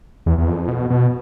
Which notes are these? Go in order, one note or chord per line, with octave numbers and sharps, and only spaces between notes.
E2
E2
F2
B2
B2